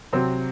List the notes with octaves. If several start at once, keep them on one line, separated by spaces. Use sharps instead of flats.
C3 F#3 C4